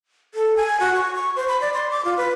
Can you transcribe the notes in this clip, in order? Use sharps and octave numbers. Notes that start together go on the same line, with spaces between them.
A4
G#5
F#4
C#6
C#6
C5
B5
D5
C6
D6
F4
B4